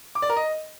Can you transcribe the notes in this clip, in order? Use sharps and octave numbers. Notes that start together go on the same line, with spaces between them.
D6
D5
A#4
D#5